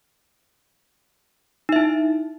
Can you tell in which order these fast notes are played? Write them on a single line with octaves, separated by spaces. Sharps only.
D#4 E5 E4